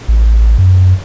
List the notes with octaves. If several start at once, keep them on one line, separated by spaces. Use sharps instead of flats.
A1
F#2